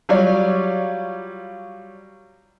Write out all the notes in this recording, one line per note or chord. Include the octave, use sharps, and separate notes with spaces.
F#3 G3 F4 C#5 D5